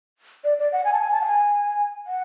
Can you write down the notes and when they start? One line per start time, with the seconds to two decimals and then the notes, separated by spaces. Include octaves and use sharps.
0.44 D5
0.59 D5
0.72 F#5
0.85 G#5
0.93 A5
0.99 G#5
1.13 A5
1.21 F#5
1.25 G#5
2.07 F#5